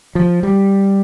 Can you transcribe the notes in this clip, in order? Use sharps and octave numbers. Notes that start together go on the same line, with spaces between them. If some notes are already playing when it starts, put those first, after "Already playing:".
F3
G3